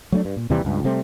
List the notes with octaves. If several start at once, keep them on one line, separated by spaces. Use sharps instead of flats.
F#3 A3 C#4 D4
G2
A#2
D#2 C3 E3 G3
C#2 G2
C3 G3 A3 C4